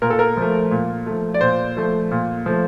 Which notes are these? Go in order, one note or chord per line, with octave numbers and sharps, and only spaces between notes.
A#2 A#4
A4
A#4
F3 A3
A#2
F3 A3
D5
A#2 C5
F3 A3
A#2
F3 A3